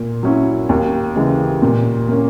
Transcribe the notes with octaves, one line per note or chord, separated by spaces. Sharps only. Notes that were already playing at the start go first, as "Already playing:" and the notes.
Already playing: A#2
F#3 C#4 E4
D#2
C#3 E3 G#3
A#2
A#3 C#4